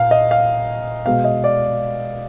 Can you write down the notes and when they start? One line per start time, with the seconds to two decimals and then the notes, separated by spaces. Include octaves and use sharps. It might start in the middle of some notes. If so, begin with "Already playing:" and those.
Already playing: A#2 F5
0.11 D#5
0.31 F5
1.06 B2 G#3 F5
1.24 D#5
1.44 D5